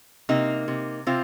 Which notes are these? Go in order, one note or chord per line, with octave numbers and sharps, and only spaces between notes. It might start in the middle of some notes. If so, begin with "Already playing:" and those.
C3 A#3 D#4
C3
C3 C4 F4